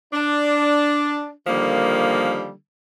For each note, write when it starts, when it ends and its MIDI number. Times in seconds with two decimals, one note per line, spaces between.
0.13 1.29 62
1.47 2.51 50
1.47 2.51 51
1.47 2.51 53
1.47 2.51 55
1.47 2.51 58